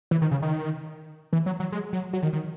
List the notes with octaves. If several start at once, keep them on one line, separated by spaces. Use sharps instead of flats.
E3
D#3
C#3
D#3
E3
F#3
F#3
G#3
F#3
F#3
D#3
D#3